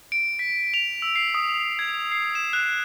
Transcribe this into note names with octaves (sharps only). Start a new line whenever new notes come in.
D7
B6
F7
E6
C7
D#6
G#6
C7
E7
F#6